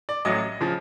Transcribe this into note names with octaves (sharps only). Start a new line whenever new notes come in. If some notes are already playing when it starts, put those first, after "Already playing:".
D5
A1 A2 F#3 D#5
C#3 F3